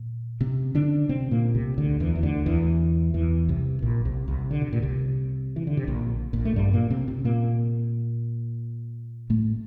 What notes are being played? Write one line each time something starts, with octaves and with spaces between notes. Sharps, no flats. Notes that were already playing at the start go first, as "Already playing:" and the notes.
Already playing: A#2
C3 C4
D3 D4
C3 C4
A#2 A#3
C2 C3
D2 D3
E2 E3
E3
D2 D3
E2 E3
E2 E3
C2 C3
A#1 A#2
C2 C3
C2 C3
D3
C3
A#2
C2 C3
E3
D3
C3
A#1 A#2
A#1 A#2
A3
G2 G3
A#2 A#3
C3 C4
C3 C4
A#2 A#3
A2 A3